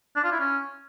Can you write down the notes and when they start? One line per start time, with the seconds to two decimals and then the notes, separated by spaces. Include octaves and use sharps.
0.16 D4
0.24 F4
0.32 E4
0.40 C#4